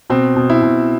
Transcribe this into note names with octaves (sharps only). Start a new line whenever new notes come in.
B2 C4
B2
E4
B2